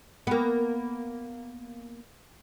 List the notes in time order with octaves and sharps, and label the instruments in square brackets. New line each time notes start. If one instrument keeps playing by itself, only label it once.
[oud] A#3 B3